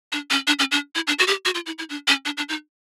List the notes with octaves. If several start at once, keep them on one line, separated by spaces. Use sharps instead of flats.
D4
C#4
D4
C#4
D4
E4
D4
F#4
G4
F#4
F4
E4
E4
D4
C#4
D4
D4
D#4